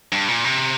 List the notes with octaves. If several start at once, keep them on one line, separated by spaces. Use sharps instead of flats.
G2
A#2
C3